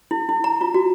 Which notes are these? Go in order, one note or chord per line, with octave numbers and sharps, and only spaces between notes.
E4
E4
A#5
F4
F#4